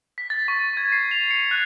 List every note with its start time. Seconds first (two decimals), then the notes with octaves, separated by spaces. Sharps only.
0.18 B6
0.30 A6
0.48 C#6
0.77 G#6
0.92 C7
1.11 F7
1.31 C#7
1.51 F#6